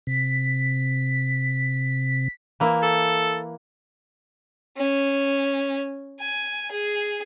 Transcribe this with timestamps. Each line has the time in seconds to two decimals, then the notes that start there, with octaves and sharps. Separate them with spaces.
0.07 C3 B6
2.60 E3 A#3 E4
2.83 A4
4.77 C#4
6.20 G#5
6.71 G#4